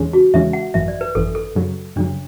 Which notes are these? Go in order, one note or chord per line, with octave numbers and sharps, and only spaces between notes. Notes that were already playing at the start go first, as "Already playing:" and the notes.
Already playing: E2 C#3 E3 G#3 C#4
F#4
E2 C#3 E3 G#3 C#4 E5
F#5
G#1 F#2 E3 E5
D5
B4
G#1 F#2 E3 A4
A4
F#2 C#3 F#3
F#2 C#3 F#3 D4